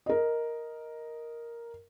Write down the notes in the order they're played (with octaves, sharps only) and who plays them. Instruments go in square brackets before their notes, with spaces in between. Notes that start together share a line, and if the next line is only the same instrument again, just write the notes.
[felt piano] A#4 D#5